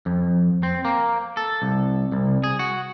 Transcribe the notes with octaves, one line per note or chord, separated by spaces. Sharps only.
F2
C4
A#3
A4
C2
C2
G#4
F#4